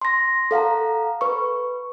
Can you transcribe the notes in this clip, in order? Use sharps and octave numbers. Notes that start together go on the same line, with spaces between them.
C6 A#6
A4 F5 F#5 A#5
B4 C#6